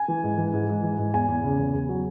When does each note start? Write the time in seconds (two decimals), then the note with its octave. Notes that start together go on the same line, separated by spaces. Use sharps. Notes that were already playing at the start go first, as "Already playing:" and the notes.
Already playing: G#5
0.08 E3
0.24 G#2
0.38 E3
0.54 G#2
0.69 G#2
0.83 E3
0.99 G#2
1.14 E2 G#5
1.28 E2
1.44 C#3
1.59 E2
1.74 E2
1.89 F#3